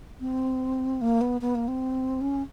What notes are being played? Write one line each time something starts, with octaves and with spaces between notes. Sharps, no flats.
C4
A#3
B3
B3
A#3
C4
C#4